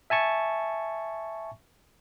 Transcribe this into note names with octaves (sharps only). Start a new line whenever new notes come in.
E5 G#5 A5 C#6